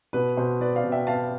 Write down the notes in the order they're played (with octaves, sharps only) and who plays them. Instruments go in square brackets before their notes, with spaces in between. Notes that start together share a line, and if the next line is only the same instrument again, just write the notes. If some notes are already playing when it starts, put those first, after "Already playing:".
[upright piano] B2 B4
B2 C5
B3 B4 D5
D5 F5
B2
E5 G5
B3 F5 A5